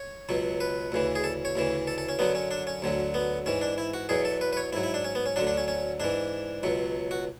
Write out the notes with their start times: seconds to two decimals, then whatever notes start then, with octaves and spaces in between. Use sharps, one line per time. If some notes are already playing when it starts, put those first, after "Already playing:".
Already playing: C#5
0.29 C#2 B2 F#3
0.60 B4
0.92 D2 C#3 E3
1.15 G#4
1.24 A4
1.45 C#5
1.56 D2 C#3 E3
1.87 A4
1.98 A4
2.09 C#4
2.19 F#2 D3 F#3 B3
2.35 C#4
2.51 D4
2.67 C#4
2.82 D2 D3 F#3
3.14 B3
3.46 G#2 E3 C#4
3.61 D4
3.78 E4
3.94 F#4
4.09 E2 B2 F#3 G#4
4.25 A4
4.41 B4
4.53 B4
4.57 C#5
4.73 G#2 F#3 E4
4.83 E4
4.94 D4
5.04 C#4
5.15 B3
5.26 C#4
5.36 F#3 D4
5.39 D2 D3
5.47 D4
5.57 C#4
5.68 C#4
6.00 G#2 E3 D4
6.63 C#2 B2 F#3
7.11 F#4